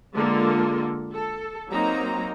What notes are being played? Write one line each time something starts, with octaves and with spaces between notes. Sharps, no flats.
D3 G#3 A#3 F4 A4
A4
F#3 A#3 C4 D#4 A#5